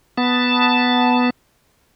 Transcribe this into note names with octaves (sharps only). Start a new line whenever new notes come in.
B3 A5